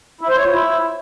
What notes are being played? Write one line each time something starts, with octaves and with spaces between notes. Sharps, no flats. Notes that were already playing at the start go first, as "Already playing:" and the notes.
E4
C5
C#5
F4
E4